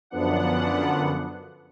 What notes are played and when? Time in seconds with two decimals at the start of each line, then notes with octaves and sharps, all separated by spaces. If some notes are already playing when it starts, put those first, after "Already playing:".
0.10 F#2 D3 F3 B3 D4 F#5